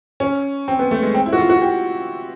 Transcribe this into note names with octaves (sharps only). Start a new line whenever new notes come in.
C#4
C4
B3
A3
G#3
C4
E4
F#4
F4
F#4
G4